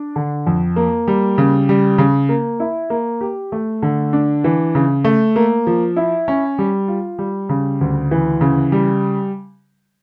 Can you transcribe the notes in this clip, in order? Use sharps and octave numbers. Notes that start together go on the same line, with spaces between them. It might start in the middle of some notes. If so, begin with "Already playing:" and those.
Already playing: D4
D3
F2
A#3
G3
C#3
G3
C#3
A#3
E4
A#3
G4
A3
D3
D4
E3
C#3
A3
A#3
F3
E4
C#4
G3
F4
G3
C#3
D2
E3
C#3
G3